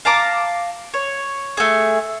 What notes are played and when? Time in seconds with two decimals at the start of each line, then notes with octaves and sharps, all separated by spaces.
0.05 F5 A5 A#5 D6
0.94 C#5
1.57 A3 G#4